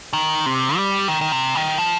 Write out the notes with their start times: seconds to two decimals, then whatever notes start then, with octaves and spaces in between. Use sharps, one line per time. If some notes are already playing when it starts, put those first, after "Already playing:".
0.13 D#3
0.46 C3
0.76 G3
1.08 D#3
1.21 D#3
1.32 C3
1.55 D#3
1.78 F3